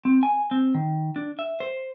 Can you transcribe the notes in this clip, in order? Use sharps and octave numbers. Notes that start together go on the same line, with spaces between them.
C4
G#5
C4
D#3
D4
E5
C5